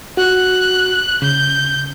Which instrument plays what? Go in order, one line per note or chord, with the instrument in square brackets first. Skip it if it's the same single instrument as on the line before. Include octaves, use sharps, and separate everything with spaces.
[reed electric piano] F#4 [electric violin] F#6
[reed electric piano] C#3 [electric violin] G6